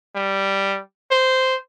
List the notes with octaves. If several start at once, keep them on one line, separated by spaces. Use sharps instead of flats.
G3
C5